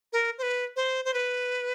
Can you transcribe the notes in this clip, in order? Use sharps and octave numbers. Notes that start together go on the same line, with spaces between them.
A#4
C5
B4
C5
C5
B4